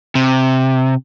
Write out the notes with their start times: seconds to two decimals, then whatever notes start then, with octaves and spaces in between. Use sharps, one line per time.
0.15 C3